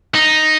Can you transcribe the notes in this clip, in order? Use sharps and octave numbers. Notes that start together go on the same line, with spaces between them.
D#4